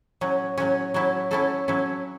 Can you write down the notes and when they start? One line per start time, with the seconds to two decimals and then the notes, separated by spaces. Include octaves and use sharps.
0.21 A2 F#3 C#4
0.58 A2 F#3 C#4
0.94 F#3 C#4 E4 A4
1.31 F#3 C#4 E4 A4
1.68 F#3 C#4 E4 A4